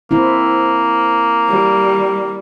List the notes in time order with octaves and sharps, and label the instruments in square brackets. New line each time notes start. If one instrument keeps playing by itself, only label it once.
[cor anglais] A#3 [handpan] C4 E4
[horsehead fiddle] G3